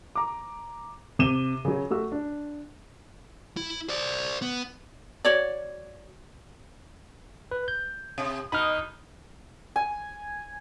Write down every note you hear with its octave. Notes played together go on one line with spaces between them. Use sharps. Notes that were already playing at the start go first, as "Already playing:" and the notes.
A#5 D6
C3 D6 D#7 E7 G7
C#3 F#3
A3 F#4 E6
D4
E4
C5 D5
B3
F#4 C#5 D5
B4
G6
C3
B2 D#4 B5 F6
G#5